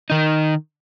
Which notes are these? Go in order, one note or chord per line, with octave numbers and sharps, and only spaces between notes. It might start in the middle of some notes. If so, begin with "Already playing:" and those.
D#3 D#4